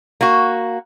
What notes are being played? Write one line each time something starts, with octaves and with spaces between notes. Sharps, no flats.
A#3 F#4